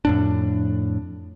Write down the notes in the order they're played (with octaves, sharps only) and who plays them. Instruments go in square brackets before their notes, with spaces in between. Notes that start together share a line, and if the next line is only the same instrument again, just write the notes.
[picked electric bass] F2 A2 D4